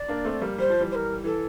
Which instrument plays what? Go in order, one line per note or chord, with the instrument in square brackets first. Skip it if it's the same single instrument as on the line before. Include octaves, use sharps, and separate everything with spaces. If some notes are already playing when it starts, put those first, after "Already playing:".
Already playing: [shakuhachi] D5
[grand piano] A#3 D4
A3 C4
G3 A#3
[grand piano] G3 [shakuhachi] C5
[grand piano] F3
E3 G3
[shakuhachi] C5
A#4
[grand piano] E3 [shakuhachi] A4